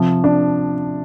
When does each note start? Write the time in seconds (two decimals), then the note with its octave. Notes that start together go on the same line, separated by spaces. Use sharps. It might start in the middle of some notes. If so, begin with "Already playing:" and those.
Already playing: C3 F3
0.24 D4